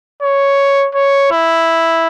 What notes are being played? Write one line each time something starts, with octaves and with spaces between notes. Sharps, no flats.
C#5
C#5
E4